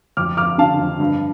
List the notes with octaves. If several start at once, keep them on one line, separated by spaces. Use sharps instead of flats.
F2 D6 F6
F2 D6 F6
D3 F5 A5
F2
G2